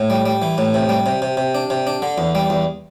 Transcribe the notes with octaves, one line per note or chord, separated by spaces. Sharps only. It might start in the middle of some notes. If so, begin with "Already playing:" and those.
Already playing: A2
G3
G3
E3
A2
C3
G3
C3
C3
C3
D4
C3
D4
D3
E2
G3
E2